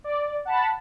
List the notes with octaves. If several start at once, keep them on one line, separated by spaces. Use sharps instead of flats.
D5
F#5 A5 B5